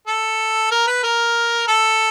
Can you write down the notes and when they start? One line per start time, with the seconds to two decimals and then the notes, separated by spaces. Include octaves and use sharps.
0.07 A4
0.71 A#4
0.87 B4
1.03 A#4
1.68 A4